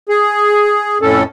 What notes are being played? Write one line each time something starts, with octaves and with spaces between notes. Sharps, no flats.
G#4
F2 A2 C#4 A4